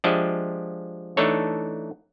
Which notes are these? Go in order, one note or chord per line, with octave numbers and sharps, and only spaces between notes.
F3 G#3 D4 G4 D#5 E5
E3 A3 D4 D#4 A4 C#5